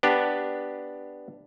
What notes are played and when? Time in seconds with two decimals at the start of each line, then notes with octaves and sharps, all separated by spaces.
0.03 B3 D4 G4